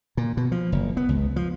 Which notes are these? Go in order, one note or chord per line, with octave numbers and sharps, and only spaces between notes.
A#2
B2
F3
F#1
B3
C#2
F3